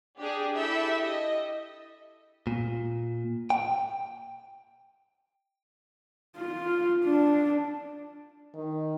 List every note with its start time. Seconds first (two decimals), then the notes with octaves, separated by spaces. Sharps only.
0.19 D4 G4 G#4
0.55 E4 G4 A4 E5
1.02 D#5
2.47 A#2
3.50 G5
6.37 F4
7.04 D4
8.55 D#3